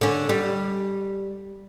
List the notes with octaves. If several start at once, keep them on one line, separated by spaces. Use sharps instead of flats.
D3 C#4
G3